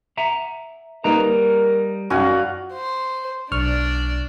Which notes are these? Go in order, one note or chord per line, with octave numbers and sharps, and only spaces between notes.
E5 F#5 A#5
G3 A#3 D#4 A#4 B4 A#5
F#2 D#3 E3 F4 F#4 D5 F5 G#5
C5
B1 D4 D5 C#6 F6